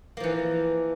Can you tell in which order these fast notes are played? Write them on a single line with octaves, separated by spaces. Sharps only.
A#3 F3 E3